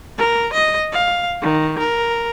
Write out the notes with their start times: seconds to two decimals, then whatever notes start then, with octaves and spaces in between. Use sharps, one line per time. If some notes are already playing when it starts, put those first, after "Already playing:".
0.18 A#4
0.53 D#5
0.93 F5
1.42 D#3
1.79 A#4